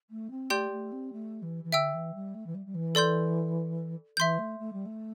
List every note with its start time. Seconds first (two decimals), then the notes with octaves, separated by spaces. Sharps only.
0.10 A3
0.30 C4
0.50 A3 G4 D5 G5 C6 G6
0.70 A3
0.92 C4
1.12 A3
1.42 E3
1.63 E3
1.72 D3 E5 G5 E6
1.93 E3
2.14 G3
2.34 A3
2.46 E3
2.54 G3
2.65 G3
2.74 E3
2.95 A4 D5 C6 G6
4.17 E3 E5 C6 G6
4.38 A3
4.59 A3
4.72 G3
4.85 A3